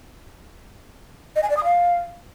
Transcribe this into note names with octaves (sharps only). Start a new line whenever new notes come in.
D#5
G#5
D5
D#6
F5